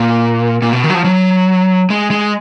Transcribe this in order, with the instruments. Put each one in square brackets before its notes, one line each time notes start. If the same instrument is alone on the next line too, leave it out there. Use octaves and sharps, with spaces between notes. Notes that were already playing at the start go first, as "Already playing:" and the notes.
Already playing: [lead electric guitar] A#2
A#2
B2
D#3
F#3
F3
F#3
G#3
G#3